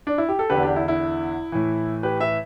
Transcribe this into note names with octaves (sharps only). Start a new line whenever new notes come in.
D4
E4
G4
A4
E2 D3 G4 B4
D4 G4
E4
E4
A2 E3
G4 B4
B4 E5